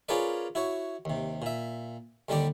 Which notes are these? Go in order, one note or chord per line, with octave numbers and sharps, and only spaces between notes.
C#4 F4 G#4 A#4 B4 D5
E4 F#4 C#5
D#2 C3
A#2 E5
D#2 D3 G3 G4 D5